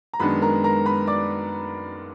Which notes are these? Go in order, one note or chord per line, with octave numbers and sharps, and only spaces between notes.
A#5
F#2 D#3 G#3 B3 D4 B4 B5
A#4 A#5
A#4 A#5
B4 B5
D5 D6